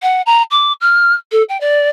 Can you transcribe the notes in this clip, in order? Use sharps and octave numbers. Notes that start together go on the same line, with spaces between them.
F#5
A#5
D6
F6
A4
G5
D5